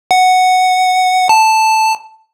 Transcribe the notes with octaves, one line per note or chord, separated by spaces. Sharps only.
F#5
A5